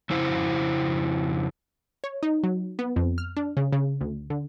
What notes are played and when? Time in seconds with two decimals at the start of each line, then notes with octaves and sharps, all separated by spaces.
0.10 F2 C#3 E4 C5
2.04 C#5
2.23 D#4
2.44 F#3
2.79 B3
2.96 F2
3.18 F6
3.37 D4
3.57 C#3
3.73 C#3
4.01 D2
4.30 D3